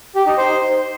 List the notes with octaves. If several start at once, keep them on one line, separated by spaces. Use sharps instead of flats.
G4
D#4
C5